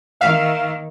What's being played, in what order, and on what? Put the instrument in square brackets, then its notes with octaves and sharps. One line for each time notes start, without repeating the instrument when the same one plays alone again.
[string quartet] D#3 A#3 [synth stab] E5 F5